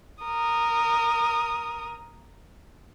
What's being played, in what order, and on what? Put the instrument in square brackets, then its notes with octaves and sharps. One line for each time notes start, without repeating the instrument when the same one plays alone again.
[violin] A#4 D#6